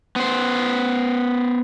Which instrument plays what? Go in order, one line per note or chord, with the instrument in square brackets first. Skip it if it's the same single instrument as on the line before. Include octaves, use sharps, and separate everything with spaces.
[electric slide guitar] B3 C5